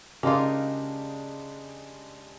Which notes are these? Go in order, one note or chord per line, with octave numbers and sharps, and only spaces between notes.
C#3 G#3 A#3 D4 D#4 F4 G4